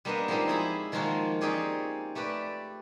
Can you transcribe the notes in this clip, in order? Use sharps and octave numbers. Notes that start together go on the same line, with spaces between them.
G3 A#3 B3 D4 C5 D#5
F3 G#3 A#3 C4 D#4 G4
E4 G#4 B5
D#3 F3 G#3 A#3 F4 F#4
C4 C#4 D#4 G4 G#4 D5
A3 G4 B4 D5